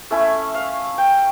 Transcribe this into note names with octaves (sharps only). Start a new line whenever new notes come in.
A3 C#4 E4 E5
F5
G5